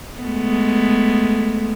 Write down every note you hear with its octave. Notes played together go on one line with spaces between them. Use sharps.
G#3 A3 B3